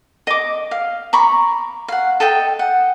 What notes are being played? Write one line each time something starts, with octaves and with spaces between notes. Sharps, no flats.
D#5 D6
F5
A#5 B5 C#6 D6
F5 F#5
A4 D#5 E5 G5
F#5